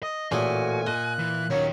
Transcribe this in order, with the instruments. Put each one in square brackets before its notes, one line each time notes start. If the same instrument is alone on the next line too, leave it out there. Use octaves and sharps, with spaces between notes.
[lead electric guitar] D#5 [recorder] D#6
[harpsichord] A1 A3 G#4 [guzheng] A#2 [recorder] F#4 [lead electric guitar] G#5
[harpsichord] A#2 [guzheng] D#5 [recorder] F#6
[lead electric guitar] E3
[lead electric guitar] D#2 D#3 [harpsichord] F#3 C#4